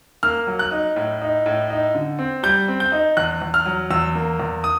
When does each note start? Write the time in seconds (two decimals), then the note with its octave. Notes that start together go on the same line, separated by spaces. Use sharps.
0.23 A#3 F6
0.47 F#3
0.59 F#6
0.71 D#4
0.96 A2
1.22 D#4
1.46 A2
1.70 D#4
1.95 D3
2.19 C4
2.43 G3 G6
2.68 C4
2.80 G6
2.92 D#4
3.17 E2 F#6
3.42 E2
3.54 F6
3.66 F#3
3.91 E2 E6
4.15 A#3
4.40 E2
4.64 D#6